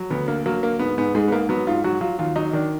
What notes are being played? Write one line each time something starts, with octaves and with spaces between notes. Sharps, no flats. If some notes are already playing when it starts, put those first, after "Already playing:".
Already playing: F#3
D2 B3
D3 A#3
F#3 A#3
D3 A#3
G#2 B3
G#2 B3
G#2 G#3
B3
G#2 A#3
F#3 B3
G#2 F4
F#3 F#4
F#3 F4
D#2 F4
F#3 D#4
D#3 D4